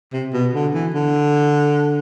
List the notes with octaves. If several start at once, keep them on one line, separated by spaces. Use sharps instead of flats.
C3
B2
D3
E3
D3